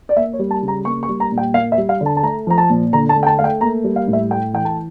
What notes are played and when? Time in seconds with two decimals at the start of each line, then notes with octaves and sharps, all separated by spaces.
0.09 D5
0.16 A#3 E5
0.33 C#5
0.39 G3
0.51 A5
0.62 C#3
0.68 A#5
0.85 A#3 C#6
1.03 C#6
1.09 G3
1.20 A#5
1.32 A#2
1.38 G5
1.54 A#3 F5
1.72 E5
1.78 G3
1.89 F5
2.01 D3
2.06 A5
2.17 A5
2.23 A3 A#5
2.47 F3 A#5
2.58 A5
2.70 A#2
2.93 D3 A#5
3.09 A5
3.16 A3
3.23 G5
3.26 A5
3.39 A3 F5
3.44 G5
3.61 A#3 A#5
3.84 G3
3.96 F5
4.08 A2
4.13 E5
4.30 A3 G5
4.53 E3 G5
4.65 A5